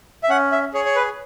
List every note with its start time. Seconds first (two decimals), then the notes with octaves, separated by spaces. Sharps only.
0.23 E5
0.29 C#4 F#5
0.52 E5
0.74 G#4 C#5
0.85 C#5
0.96 B4